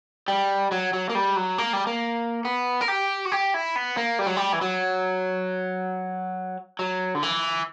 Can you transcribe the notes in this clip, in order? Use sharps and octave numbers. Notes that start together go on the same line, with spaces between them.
G3
F#3
F#3
A#3
G3
F#3
A#3
G3
A#3
B3
A#4
G4
F#4
G4
E4
B3
A#3
G3
F#3
G3
E3
F#3
F#3
D3
E3